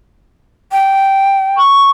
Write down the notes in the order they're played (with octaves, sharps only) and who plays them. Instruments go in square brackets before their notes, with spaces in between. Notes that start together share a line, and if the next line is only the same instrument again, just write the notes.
[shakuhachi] G5
[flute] C#6